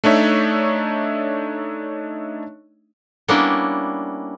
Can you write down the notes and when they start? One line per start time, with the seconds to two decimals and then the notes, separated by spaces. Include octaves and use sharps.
0.04 A3 D4 D#4 C#5 E5
3.28 G3 A#3 B3 C#4 D4 E4